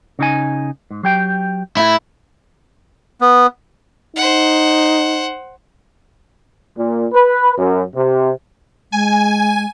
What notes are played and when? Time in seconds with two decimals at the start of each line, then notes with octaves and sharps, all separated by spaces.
0.19 C#3 D#4 G#5
0.91 G#2
1.03 F#3 G4 G5
1.77 A2 E4
3.21 B3
4.16 D#4 C5 F#5
6.78 A#2
7.13 B4
7.58 F#2
7.95 C3
8.92 G#3 G#5